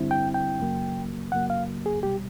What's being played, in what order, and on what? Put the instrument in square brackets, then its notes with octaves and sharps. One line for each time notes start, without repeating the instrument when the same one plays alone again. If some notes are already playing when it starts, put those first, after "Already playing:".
Already playing: [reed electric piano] G2 D3 G3 C4 E4
G5
G5
F#2 C#3 F#3 A#3
F#2 C#3 F#3 A#3 F#5
F5
G#4
C2 B2 G3 G4